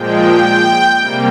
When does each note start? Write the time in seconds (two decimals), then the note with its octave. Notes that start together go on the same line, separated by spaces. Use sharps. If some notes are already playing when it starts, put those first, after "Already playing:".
Already playing: A#2 F3 G#3 G5
0.98 C3 G3 A#3